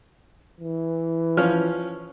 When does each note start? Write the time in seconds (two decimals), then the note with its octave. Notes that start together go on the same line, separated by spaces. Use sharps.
0.60 E3
1.37 F3 C#4 F6